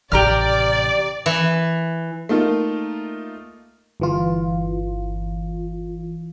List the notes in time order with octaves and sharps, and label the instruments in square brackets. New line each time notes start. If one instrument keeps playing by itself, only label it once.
[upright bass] A1 C3 [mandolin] G4 A#5 F6 [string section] D5
[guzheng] E3
[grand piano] A3 A#3 D#4 F4 A#4
[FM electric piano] G1 E3 F4